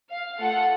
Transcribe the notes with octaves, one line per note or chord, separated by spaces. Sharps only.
F5
A3 F4 A4 F#5